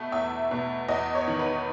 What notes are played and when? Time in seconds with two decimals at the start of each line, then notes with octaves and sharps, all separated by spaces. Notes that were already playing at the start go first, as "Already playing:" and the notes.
Already playing: B2 A3
0.12 E2 E5
0.51 B2
0.88 E2 D#5
1.15 C#5
1.28 D#3
1.39 B4